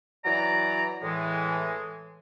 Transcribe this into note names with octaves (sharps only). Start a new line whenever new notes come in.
E3 F#3 D5 A#5
A2 E3 G#3